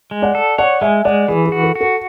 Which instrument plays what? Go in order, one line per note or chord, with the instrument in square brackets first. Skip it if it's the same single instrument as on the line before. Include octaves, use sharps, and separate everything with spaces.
[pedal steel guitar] G#3
[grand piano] D5 F#5
[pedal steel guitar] A4
[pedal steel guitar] C#5 [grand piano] D5 F#5
[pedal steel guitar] G#3 [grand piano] E5 G#5
[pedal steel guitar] G#3 [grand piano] D5 F#5
[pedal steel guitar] E3 [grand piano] G#4
[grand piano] G#4
[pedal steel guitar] F#4
[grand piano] A4
[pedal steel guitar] F#4
[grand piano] A4